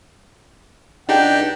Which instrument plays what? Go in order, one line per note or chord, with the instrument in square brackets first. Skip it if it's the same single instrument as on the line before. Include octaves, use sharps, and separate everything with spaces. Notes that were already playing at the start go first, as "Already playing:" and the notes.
[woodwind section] C#2 F#5 G5 [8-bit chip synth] D4 D#4 G4